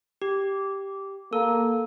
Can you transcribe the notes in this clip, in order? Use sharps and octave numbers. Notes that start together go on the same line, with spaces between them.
G4
A#3 A4